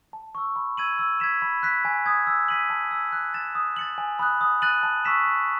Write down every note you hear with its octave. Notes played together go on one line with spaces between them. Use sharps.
A5
C#6 E6
B5
E6 G#6 D#7 F#7
E6
G#6 B6 E7
B5
F#6 B6
G#5
D#6 G#6
E6
B6 D#7 F#7
A5
E6 G#6
F#6
A6 E7
D#6
A6 C#7 F#7
G#5
B5 D#6 F#6
D#6
F#6 A6 D#7 F#7
A5
C#6 E6 B6 E7
F#6